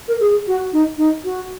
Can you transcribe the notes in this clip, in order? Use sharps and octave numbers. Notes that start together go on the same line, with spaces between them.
A#4
G#4
F#4
D#4
D#4
F#4